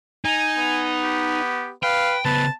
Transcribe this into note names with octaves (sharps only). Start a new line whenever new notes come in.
D#4 G#5
B3
G4
B4 F5 G5
C#3 B3 B4 A5